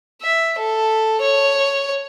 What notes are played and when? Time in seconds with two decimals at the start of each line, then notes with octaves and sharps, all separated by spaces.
0.21 E5
0.58 A4
1.21 C#5